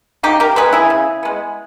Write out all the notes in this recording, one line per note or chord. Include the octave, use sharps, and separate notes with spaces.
C#3 D#4 G4
G4 A#4
G#3 B3 G#4 B4
E4 G#4
C#3
G#3 B3